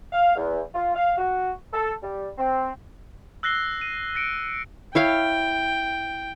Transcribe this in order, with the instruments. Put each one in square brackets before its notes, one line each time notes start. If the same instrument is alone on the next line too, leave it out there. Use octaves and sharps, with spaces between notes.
[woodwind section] F5
E2
F4
F5
F#4
A4
G3
C4
[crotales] E6 F#6 A#6 C7 G7
D#7
A#6 C#7 D7
[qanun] E4 C#5 F5 [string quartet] G5